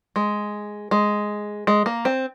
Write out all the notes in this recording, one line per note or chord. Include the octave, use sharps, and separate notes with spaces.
G#3
G#3
G#3
A#3
C4